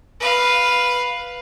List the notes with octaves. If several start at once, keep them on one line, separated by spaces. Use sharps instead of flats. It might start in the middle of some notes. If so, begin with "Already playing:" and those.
B4 F5